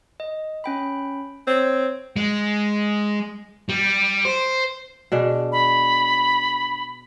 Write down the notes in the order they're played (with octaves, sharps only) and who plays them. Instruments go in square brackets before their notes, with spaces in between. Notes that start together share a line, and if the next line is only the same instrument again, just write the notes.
[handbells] D#5
C#4 G5 B5
[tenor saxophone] C4 [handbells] C#5
[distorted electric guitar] G#3
G3
C5
[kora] B2 D4 G#4
[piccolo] B5